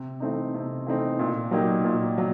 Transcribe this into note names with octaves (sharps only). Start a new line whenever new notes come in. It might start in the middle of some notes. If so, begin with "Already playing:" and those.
Already playing: C3
E3 A3 C4 D#4
C3
E3 A3 C4 D#4
A#2
F#3 A#3 D#4 G4
A#2
F#3